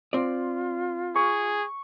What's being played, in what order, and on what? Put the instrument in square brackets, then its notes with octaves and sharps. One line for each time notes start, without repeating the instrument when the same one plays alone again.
[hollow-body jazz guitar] C4 D5 [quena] F4
[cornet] G#4 [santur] C#6